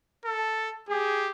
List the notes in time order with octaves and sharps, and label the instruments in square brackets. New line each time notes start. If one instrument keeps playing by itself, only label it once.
[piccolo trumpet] A4
[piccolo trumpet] G4 [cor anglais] G#4